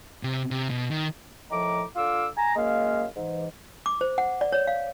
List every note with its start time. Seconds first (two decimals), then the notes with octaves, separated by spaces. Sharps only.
0.23 C3
0.51 C3
0.70 B2
0.91 D#3
1.50 A2 D#3 F3 A#5 D6
1.95 D3 F4 F5 D6 E6
2.37 G#5 A#5
2.56 F#2 G#3 A#3 A#4 F5
3.16 G#2 E3
3.86 D6
4.01 C5
4.18 F#5
4.41 D5
4.52 C#5
4.67 F5